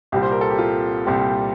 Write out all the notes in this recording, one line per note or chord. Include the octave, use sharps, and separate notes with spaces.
C2 A#2 G3 C4 G4
C5
A#4
A4
G4
F4
C2 A#2 G3 C4 G4